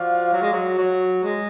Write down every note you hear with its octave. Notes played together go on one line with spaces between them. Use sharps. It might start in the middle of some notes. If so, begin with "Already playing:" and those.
Already playing: F3 F#4 D5 F5
F#3
G#3
F#3
F#3
G#3